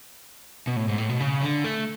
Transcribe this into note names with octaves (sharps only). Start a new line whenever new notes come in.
B2
A2
G#2
A2
B2
C#3
D3
A3